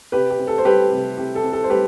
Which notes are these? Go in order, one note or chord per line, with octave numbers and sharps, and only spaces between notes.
C3 G4 B4
G4
C4
A4
C5
G3 G4 B4
C3
C3 G4
A4
C4
A4
C5
G3 G4 B4